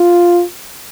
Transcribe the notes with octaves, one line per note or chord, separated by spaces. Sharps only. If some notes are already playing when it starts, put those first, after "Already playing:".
Already playing: F4